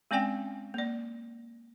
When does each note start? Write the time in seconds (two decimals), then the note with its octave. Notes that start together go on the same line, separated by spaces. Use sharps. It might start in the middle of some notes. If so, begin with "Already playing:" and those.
0.11 G#3 C4 C#4 D5 G5 G#5
0.74 A#3 D5